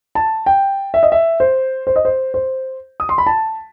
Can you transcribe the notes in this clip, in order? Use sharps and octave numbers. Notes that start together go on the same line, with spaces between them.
A5
G5
E5
D#5
E5
C5
C5
D#5
C5
C5
D#6
C6
B5
A5